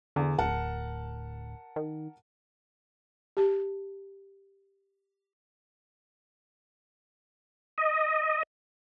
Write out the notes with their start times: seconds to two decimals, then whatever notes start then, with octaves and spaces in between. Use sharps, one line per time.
0.16 E2 D3
0.38 D1 A#4 F#5 A5
1.76 D#3
3.37 G4 A5
7.78 D#5